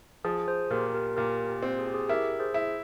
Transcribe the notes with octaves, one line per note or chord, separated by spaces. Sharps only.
F3 G#4
G#4 C5
A#2 G4 A#4
G4 A#4
A#2 G4 A#4
G4
C4
G#4
G4
G#4
E4 G4 A#4
G#4 C5
E4